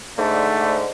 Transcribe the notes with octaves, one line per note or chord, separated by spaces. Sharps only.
G#2 D3 A3